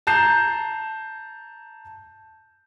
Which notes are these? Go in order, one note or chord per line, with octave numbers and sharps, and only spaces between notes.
A5 A#5 G6 C7 E7